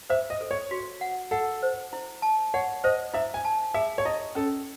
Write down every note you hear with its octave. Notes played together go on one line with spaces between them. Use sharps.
C5 E5
D#5
A4
C#5
F#4
F#5
A4 F#5
C5
E4
A5
C#5 F#5
C5 D#5
E4 E5
G#5
A5
G#4 E5
C#5
E4 D#5
C#4 A4